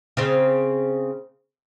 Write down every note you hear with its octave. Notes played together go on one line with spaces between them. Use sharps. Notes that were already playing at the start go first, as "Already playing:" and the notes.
C#3 C4